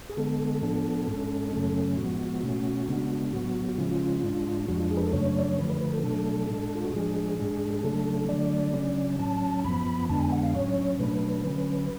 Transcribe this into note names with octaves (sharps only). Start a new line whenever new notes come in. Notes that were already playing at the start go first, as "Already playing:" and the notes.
G#4
D3 G#3 B3 A4
A2 F3 B3 D4
G#2 G#3 C#4
F#2 C#3 F#3 A3 C#4
A2 F3 G#3 B3 F#4
B2 A3 C#4
C#3 G#3 B3 D4
A2 F#3 B3 F#4
F#4
C#3 F3 G#3 C#4 F4
G#2 G#3 D4
F2 F3 G#3 D4 F#4
F4
G#4
B4
A4
F#2 C#3 F#3 A3 D4 C#5
D5
C#5
D3 F3 A3 B4
B4
B4
A4
B2 F#3 A3 D4 A4
A2 G#3 D4
F4
F#4
A2 F3 G#3 D4 G#4
G#2 G#3 D4
G#4
C#3 F#3 A3 D4 A4
D3 F#3 A3 D4 D5
C#3 F#3 C#4
A2 F#3 C#4 A5
F#2 F3 B3 B5
F2 D3 G#3 B3 D4 A5
G#5
F#5
F5
A2 F#3 C#4 C#5
B2 F#3 A3 D4 B4
D3 F#3 C#4